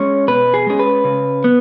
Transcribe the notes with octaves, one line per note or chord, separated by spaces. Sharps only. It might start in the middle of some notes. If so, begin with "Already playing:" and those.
Already playing: G#3 C#4 C#5
B2 B4
G#4
G#3 C#4 G#4
B4
C#3
B3